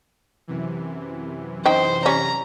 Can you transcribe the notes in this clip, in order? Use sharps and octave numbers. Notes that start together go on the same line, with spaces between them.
F#2 C3 E3
D#4 C5 G5
G3 C#4 A#5